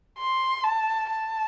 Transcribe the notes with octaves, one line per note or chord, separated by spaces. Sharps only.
C6
A5
A5